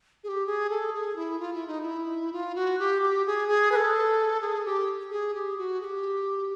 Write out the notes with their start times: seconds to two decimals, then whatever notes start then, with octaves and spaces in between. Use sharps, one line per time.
0.24 G#4
0.28 G4
0.46 G#4
0.70 A4
0.93 G#4
1.16 E4
1.39 F4
1.54 E4
1.67 D#4
1.82 E4
2.33 F4
2.55 F#4
2.79 G4
3.02 G4
3.26 G#4
3.48 G#4
3.72 B4
3.76 A4
4.41 G#4
4.65 G4
5.11 G#4
5.34 G4
5.57 F#4
5.81 G#4
5.84 G4